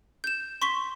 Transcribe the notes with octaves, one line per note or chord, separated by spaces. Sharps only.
G6 E7
C6 C#6 B6 G7